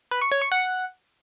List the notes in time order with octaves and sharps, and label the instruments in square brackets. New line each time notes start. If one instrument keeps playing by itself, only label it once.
[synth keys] B4
C#6
C#5
C#6
F#5